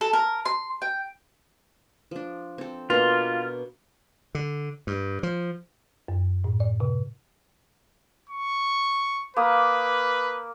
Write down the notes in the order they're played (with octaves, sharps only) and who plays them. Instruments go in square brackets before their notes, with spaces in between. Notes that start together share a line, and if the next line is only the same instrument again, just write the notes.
[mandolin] A4
A#4
C6
G5
[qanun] F3 D4
C4 A4
[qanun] B2 A#3 D4 [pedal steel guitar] F4
[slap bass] D3
G2
F3
[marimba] F#2
A2
D5
C3
[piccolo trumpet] C#6
[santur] A#3 D#6 [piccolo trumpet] B4